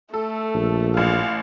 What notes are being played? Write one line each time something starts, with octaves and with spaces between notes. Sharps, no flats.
A3 A4
A#1
A1 F5